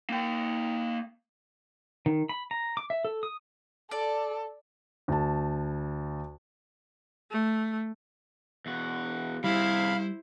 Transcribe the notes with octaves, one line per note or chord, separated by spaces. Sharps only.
A#3 G5
D#3
B5
A#5
D6
E5
A4
D#6
A4 D5
D2 A5
A3
E2 F#4
C3 G3 E4 G#4 C5 F5 B5